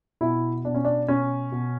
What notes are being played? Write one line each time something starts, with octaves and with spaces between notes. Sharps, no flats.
B2 E4
B2 D4
C#4
D4
B2 C#4
B2